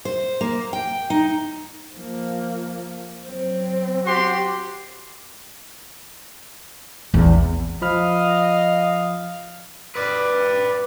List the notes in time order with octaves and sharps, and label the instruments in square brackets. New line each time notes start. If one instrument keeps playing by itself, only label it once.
[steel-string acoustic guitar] C5
A#3
G5
D#4
[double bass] F3 A#3
F#3 C4
[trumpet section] F#4 G4 C6
[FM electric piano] A#1 [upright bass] E2 C4
[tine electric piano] F3 B5 F6 [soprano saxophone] D#5 [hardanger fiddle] F5
[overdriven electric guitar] B4 D5